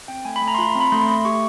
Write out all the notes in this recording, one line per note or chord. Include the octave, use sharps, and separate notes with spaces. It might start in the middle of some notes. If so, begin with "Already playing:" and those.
C4 G5
A3 G#5
B5
A3
A#5
C6
F4 B5
A#5
C4
B5
A3 C6
A3
G4 C#6